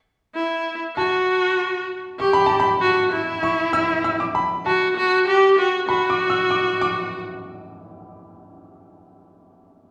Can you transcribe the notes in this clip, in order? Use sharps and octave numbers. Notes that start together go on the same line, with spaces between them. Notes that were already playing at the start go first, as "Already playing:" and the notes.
E4
F#4 A5
G4 C#6
B5
A5
B5
F#4
E4
C#6
E6
E6
D6
B5
F#4 A5
F#4
G4
F#4
F#4 B5
D6
E6
D6
D6